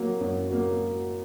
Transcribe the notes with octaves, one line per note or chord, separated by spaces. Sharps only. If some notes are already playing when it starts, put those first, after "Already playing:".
Already playing: F#3 A#3
F#2
F#3 A#3